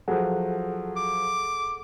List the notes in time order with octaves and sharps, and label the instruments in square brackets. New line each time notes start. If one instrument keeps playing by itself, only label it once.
[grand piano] F3 F#3 [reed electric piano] G#4 A4 F#5
[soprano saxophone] D6